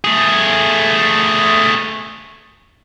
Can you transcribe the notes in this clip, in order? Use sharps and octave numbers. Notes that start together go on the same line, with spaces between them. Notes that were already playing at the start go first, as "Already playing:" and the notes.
A3 G#4